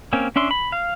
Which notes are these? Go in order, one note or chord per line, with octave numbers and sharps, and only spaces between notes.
A#3 C4 C#4
C#4 D4 E5 C6
B5
F5